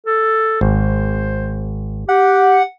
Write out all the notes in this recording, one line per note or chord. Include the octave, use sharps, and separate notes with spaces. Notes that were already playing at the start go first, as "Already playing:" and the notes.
A4
G#1 C5
G4 F#5